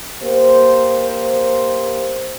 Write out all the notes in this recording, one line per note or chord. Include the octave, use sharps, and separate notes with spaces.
A#3 G4 C5